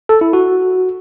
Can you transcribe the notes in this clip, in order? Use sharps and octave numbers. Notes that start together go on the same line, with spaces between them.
A4
E4
F#4